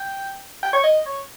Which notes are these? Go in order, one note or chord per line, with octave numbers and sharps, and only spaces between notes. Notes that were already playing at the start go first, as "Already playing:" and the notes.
Already playing: G5
G5
C#5
D#5
C#5